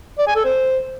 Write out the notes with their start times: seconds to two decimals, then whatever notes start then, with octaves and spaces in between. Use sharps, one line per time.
0.18 D5
0.27 G#5
0.36 A4
0.44 C5